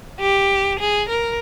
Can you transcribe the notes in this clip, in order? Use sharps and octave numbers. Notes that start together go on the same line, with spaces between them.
G4
G#4
A#4